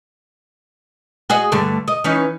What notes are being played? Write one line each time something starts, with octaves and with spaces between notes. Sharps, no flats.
F#4 G#4 D#5
G2 D3 A3
D#5
E3 C#4 D#4